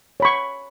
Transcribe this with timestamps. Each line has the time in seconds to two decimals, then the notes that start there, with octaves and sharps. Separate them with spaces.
0.20 C#5
0.22 B5
0.25 C#6